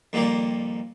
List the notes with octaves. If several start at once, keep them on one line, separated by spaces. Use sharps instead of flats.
F2 A#2 D#3 G3 A#3